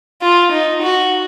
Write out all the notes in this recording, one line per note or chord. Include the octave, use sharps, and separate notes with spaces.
F4
D#4
F#4